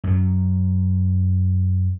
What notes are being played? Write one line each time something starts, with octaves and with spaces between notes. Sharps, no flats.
F#2 F#3